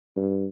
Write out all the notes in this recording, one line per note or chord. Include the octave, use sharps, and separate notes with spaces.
G2